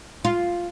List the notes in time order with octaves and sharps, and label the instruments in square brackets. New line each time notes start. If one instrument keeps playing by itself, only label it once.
[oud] F4